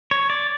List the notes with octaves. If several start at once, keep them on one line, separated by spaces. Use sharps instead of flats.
C#5
D5